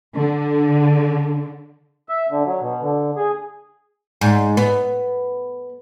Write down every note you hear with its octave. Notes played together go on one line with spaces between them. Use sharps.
D3
E5
D3
F#3
B2
D3
G#4
G#2
B3